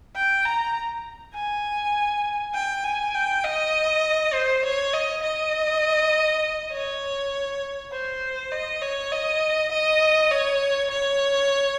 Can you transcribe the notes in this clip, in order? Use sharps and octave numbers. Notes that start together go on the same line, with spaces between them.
G5
A#5
G#5
G5
G#5
G5
D#5
C5
C#5
D#5
D#5
C#5
C5
D#5
C#5
D#5
D#5
C#5
C#5